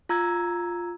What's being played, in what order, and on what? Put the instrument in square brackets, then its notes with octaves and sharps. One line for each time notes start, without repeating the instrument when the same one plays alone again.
[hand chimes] F4 A#5 E6 G#6